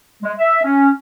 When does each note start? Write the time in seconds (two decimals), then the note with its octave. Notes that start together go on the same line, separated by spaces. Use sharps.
0.23 G#3
0.38 E5
0.63 C#4